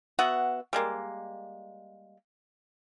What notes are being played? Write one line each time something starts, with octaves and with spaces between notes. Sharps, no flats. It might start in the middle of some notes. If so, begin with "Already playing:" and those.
B3 F#4 E5 F#5
G3 G#3 A#3